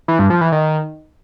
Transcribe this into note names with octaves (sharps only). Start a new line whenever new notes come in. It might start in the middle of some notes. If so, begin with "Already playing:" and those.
E3
G2
F3
E3
D#3